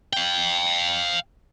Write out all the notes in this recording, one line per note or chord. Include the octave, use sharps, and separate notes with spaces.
F5 G5